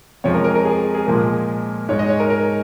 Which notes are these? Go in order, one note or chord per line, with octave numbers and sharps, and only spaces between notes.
F2 F3 G#3 C#5
A#4
A#4
A#4
G#4
G#4
A#2 F3 G#3 A#4
G#2 G#3 C#5
D#5
C#5
A#4
A#4